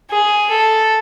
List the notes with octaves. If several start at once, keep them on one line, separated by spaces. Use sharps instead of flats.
G#4
A4